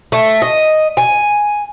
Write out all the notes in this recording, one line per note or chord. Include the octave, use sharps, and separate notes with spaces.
A3
D#5
G#5